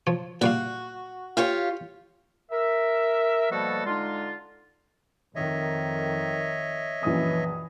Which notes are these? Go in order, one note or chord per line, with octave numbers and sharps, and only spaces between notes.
F3 C#5
A#2 G3 F#4 F5
F4 G4 C#5
A#4 E5
B2 F3 G3 A#3 F#4 A4
D3 G#3 D#4 F4
F2 D#3 C#5 D#5 E5
A#1 F#2 E3 D#6